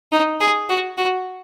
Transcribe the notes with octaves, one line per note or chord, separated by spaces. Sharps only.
D#4
G#4
F#4
F#4